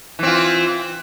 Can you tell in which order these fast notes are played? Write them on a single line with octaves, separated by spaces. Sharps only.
E3 C4 F4